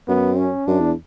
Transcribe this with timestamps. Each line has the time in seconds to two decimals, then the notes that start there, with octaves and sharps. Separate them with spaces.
0.08 F#2 B3
0.38 C#4
0.67 F#2 D4
0.80 E2